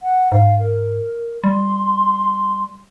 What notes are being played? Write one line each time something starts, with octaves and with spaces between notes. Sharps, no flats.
F#5
G#2 F5
A#4
G3 C6